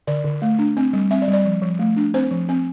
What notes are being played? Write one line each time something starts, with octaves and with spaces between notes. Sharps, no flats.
D3 D5
D3
A3
D4
C4
G3
C4 E5
D5
G3
D5
F3
F3
A3
D4
C4 C5
F3
C4